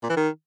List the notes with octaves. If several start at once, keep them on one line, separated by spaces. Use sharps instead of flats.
A#2
E3
D#3